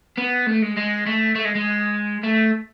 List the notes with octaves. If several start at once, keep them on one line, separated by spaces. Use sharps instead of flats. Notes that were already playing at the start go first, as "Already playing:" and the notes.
B3
A3
G#3
G#3
A3
A3
G#3
G#3
A3